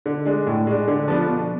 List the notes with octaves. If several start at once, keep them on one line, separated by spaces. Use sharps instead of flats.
D3
G#3 D4
A2
G#3 D4
D3
F3 B3 D4
B2